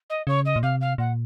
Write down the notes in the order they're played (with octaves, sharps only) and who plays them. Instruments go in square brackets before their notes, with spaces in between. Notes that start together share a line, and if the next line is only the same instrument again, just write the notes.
[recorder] D#5
[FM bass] C#3 [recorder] C#5
[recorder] D#5
[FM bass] A#2
[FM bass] C3 [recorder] F5
[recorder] F5
[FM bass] A#2 [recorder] F#5